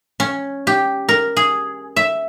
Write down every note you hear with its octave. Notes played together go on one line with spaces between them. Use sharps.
C#4
G4
A#4
G#4
E5